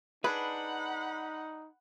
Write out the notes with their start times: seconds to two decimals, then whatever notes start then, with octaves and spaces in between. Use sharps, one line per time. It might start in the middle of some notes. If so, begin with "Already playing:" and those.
0.24 D4 D#4 G#4 B4 F#5 B5